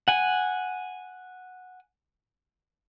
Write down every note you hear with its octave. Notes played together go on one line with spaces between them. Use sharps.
F#5 G#5